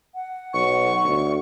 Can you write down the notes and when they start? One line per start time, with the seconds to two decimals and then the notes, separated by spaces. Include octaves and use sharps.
0.15 F#5
0.53 B1 C#6
1.04 D2